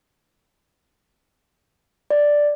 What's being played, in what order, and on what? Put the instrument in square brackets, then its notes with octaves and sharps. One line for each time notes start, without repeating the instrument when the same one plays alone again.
[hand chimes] D5